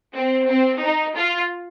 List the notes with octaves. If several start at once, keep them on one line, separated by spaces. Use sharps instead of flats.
C4
C4
D#4
F4